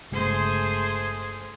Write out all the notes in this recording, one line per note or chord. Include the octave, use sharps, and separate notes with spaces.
G1 C#3 G#3 A3 G#4 C5